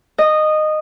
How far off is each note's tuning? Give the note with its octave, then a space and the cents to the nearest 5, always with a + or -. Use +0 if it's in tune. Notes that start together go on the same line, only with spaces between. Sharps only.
D#5 -15